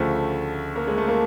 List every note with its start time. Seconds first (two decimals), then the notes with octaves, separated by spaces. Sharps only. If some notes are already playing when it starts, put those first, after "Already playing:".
Already playing: D2 C#3 F3 A3
0.76 A#3
0.87 G#3
0.98 A3
1.08 A#3